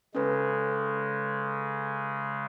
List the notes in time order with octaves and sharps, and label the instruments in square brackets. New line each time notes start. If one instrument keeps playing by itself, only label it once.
[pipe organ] C#3 G#3 [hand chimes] C#4 A4 B4